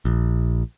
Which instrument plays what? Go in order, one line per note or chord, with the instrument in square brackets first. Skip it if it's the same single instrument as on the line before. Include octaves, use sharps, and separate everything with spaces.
[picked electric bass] A#1